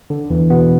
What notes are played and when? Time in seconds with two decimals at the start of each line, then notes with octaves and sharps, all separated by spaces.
0.10 D3
0.30 E2 E3
0.50 B2 B3